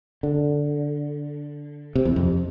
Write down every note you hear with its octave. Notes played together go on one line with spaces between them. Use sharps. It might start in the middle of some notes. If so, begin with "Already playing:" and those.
D3
C3
E2
F2